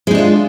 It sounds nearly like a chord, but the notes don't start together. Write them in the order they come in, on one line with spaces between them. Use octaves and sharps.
G#3 D#4 D4 F4